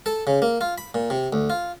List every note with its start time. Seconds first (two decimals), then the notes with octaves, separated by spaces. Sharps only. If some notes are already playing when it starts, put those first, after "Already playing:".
0.06 A4
0.27 C#3
0.42 A#3
0.61 F4
0.78 B5
0.94 A#2
1.10 C3
1.33 D2
1.50 F4